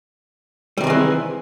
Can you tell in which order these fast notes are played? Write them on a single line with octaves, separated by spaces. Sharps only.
G3 D#3 C4 G#3 E3